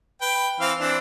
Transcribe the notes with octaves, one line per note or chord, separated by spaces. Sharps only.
B4 G5
E3 C4 F5
E3 C4 D4